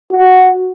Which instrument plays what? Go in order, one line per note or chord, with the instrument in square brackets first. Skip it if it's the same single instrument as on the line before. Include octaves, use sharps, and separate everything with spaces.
[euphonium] F#4